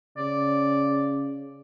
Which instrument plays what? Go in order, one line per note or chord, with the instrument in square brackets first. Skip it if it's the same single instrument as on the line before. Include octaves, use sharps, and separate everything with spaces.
[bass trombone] C#3 [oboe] D5